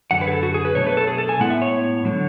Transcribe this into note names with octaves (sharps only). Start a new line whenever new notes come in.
F#2 D3 F#3 F#5
B4
G#4
A4
F#4
G#4
B4
B2 F#3 A3 D4 C#5
B4
A4
G#4
A4
G#5
A2 G#3 B3 E4 F#5
E5
C#5
D3 F#3